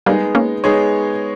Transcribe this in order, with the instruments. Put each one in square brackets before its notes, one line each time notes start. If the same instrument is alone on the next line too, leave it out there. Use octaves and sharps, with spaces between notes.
[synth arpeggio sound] G3 A#3 [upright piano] G#3 B3 D#4 G#4
[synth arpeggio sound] A#3 C#4
[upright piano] G#3 B3 D#4 G#4 C#5